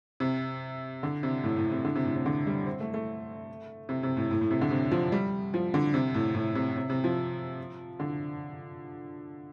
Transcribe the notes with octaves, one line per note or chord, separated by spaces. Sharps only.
C3
D3
C3
A2
A2
C3
D3
C3
A2
C3
D3
G3
C4
A3
A3
C3
C3
A2
A2
A2
C3
D3
C3
F3
G3
F3
D3
C3
A2
A2
C3
C3
C3
F3
D3